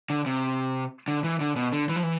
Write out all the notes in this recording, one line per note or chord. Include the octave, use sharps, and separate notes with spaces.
D3
C3
D3
E3
D3
B2
D3
E3
F3
E3